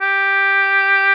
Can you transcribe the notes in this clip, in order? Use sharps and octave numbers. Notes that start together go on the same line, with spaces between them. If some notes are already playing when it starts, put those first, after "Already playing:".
G4